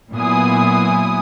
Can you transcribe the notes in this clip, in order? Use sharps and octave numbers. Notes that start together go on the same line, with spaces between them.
A#2 F#3 B3 E4 G#5 D#6